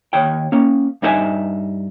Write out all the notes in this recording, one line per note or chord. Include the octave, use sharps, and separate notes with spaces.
D#2 C#5 G5
A#3 C#4
G2 D#4 F4 C5 E5 G#5